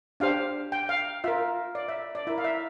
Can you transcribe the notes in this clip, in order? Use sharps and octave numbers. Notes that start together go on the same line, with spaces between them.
D4 G4 C5 F5
G5
F5
F4 A#4 E5
D5
E5
D5
E4 A#4 E5
F5
E5